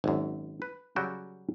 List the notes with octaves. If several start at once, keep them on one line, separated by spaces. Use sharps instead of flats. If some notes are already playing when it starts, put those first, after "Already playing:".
G#1 F#2
B4
C#3 F#3 G3 F#4 G5